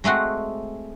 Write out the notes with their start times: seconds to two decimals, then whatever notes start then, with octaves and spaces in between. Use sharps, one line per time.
0.04 G#3 A3 C4 F#4 F#5